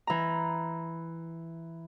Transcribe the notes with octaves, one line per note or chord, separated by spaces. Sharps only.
E3 A#5